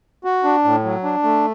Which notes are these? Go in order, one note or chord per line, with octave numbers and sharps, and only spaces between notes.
F#4
D4
A2
F#3
D4
A3